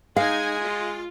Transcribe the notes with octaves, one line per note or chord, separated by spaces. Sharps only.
G#3 D#4 F5 G#5
F4